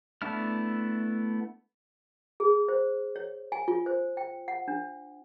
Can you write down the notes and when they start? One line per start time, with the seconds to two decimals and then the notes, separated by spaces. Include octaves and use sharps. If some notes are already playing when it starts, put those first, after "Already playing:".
0.22 A3 B3 D4 E4 F6
2.40 G#4
2.68 C5
3.16 C#5
3.52 G#5
3.68 F4
3.86 C5
4.17 G5
4.48 F#5
4.68 D4